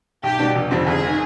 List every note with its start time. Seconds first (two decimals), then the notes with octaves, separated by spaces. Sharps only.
0.23 B1 G4
0.39 B2 G3 D4
0.55 F1
0.71 F2 D3 G3 C4
0.86 G1 G#4
1.07 D#3